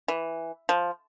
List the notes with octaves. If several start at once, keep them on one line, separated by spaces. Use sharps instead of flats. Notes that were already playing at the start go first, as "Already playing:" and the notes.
E3
F3